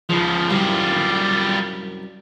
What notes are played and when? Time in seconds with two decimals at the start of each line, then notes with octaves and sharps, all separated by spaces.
0.09 C#2 C#3 F3
0.50 C2 F#2 G3 F4